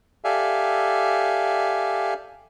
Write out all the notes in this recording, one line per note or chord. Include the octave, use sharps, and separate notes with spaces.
G4 A4 D5 E5 F5 G#5